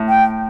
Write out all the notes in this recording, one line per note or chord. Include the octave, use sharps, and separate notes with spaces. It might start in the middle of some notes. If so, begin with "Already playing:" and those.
Already playing: A2
G5